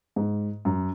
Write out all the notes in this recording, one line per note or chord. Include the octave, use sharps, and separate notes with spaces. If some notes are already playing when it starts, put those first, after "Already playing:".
G#2
F#2